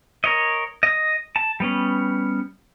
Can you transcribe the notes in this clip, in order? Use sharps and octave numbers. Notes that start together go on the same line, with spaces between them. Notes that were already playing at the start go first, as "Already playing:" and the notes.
A#4 C#5 D#5
D#5 D#6
A5
G3 B3 C#4